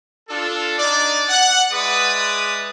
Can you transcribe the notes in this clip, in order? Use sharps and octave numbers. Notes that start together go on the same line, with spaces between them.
D4 F4 A4
D4 D#4 D5
F#5
G#3 E4 B4 D5 D#6